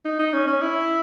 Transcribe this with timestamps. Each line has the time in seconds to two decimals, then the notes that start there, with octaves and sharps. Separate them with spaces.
0.05 D#4
0.19 D#4
0.33 C#4
0.48 C#4
0.61 E4